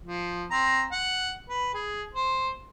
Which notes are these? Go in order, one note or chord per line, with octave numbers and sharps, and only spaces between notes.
F3
C4 A#5
F#5
B4
G#4
C5